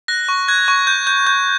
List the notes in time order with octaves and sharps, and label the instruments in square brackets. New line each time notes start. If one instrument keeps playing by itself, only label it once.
[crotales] F#6 A#6
C#6
F#6 G#6
C#6
G6
G6
G6